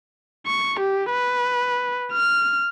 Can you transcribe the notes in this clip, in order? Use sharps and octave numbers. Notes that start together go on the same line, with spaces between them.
C#6
G4
B4
F6